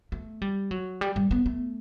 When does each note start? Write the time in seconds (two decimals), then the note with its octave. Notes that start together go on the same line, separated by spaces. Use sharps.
0.12 A3
0.42 G3
0.71 F#3
1.01 G3
1.16 G3
1.31 B3
1.46 A3